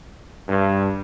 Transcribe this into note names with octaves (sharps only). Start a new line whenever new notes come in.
G2